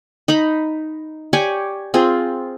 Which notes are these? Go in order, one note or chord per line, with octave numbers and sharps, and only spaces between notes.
D#4 A#5 B5
G4 C#5 D5 G#5
C4 F4 G#4